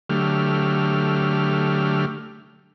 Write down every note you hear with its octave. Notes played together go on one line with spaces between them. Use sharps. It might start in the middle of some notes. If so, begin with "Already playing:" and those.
D3 F#3 A3 G4 F6